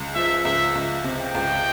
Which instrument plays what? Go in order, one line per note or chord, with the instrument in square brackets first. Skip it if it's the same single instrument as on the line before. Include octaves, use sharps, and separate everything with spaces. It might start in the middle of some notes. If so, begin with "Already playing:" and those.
Already playing: [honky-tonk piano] C#2
[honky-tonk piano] F3 [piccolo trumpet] E5
[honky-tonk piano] C#2 [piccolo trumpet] E5
[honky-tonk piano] C#2
C3
[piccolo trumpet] G5
[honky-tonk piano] C#2